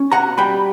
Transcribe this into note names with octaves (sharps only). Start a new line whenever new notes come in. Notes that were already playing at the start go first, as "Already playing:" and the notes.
Already playing: C#4
B2 F#5 A#5
G3 G5 B5